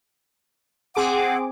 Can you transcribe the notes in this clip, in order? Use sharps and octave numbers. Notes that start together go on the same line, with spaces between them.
C4 G#4 F#5 D6